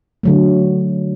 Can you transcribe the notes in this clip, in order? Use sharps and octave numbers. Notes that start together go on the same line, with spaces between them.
D3 F#3 A3